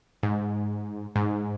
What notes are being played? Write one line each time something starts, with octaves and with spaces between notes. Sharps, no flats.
G#2
G#2